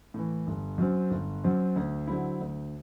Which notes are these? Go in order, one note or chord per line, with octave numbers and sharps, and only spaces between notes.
A2 E3
G1
F#2 F#3 C4
G1
F#2 F#3 C4
D2
D3 F#3 C4 E4
D2